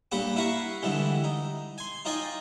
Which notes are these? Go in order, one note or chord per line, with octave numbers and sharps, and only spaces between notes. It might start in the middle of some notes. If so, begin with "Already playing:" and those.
G2 A#2 G4 B4 F#5 D6
E4 B4 F5 F#5 A#5 C#6
G2 D3 E3 G3 G#3
D#4
G#5 C6
D#4 F4 D5 D#5 G5 G#5